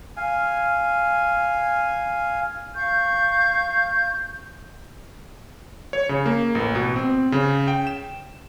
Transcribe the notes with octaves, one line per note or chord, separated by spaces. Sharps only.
F5 G#5
F5 C#6 G6
C#5
C#3
A#3
A1
B2
C4
C#3
G5
E7